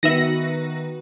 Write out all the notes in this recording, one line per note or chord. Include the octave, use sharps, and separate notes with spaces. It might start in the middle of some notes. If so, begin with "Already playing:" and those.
D#3 B3 D#4 F#4 B4 E5 A#6